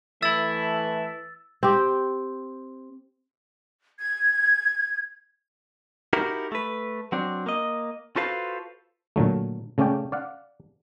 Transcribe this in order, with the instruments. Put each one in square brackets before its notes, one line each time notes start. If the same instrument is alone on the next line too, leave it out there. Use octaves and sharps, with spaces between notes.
[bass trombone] E3 [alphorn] A3 [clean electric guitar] E4 E5 [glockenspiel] E6 A6
[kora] C4 G4
[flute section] G#6
[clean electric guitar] D#4 E4 F#4 G4 A#4
A3 B4
F#3 C4 D4
A#3 D#5
F4 F#4 A4 B4 C5 F5
[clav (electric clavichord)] A#2 D3 F#3 A3
C#3 A3 C#4 D5 G5
D5 F5 F#5